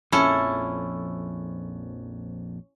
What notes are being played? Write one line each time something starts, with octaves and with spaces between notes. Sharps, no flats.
A#1 F2 C#4 E4 A4